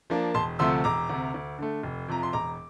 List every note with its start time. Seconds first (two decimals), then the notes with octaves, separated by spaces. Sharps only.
0.10 F3 A#3 D4
0.34 E1 A5 C6
0.59 D2 C3 F3 A3 C6 E6
0.84 E1 A#5 D6
1.10 D2 C3
1.34 D2
1.59 D3 A3
1.83 F1
2.08 F2 C3 F3 A#5
2.23 C6
2.33 E1 A#5 D6